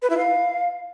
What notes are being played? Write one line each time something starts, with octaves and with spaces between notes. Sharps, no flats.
B4
E4
F5